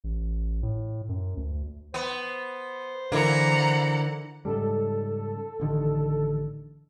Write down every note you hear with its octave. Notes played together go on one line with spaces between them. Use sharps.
A1
A2
F#2
D2
B3 C5
D3 E3 A#3 E4 F#5 A#5
G#2 C#3 G3 A4
A1 D3 D#3